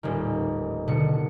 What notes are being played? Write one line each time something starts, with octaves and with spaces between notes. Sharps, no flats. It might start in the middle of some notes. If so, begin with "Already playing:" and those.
D#1 A1 D#3
F#1 B2 D3 D#3 C#7